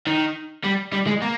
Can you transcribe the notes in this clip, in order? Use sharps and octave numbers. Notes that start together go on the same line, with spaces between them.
D#3
G3
G3
G#3
A#3